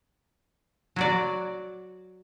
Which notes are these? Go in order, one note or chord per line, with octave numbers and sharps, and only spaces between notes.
F#3 F#4 D5